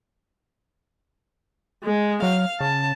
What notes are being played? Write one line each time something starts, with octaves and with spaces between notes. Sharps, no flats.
G#3
F#3 F5
C#3 A5